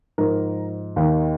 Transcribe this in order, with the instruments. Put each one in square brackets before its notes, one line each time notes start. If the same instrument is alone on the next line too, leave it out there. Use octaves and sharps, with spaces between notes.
[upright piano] G#2 F3 A#4
D#2 D#3